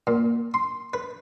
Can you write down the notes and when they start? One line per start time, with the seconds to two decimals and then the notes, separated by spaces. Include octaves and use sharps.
0.07 A#2
0.54 C6
0.94 B4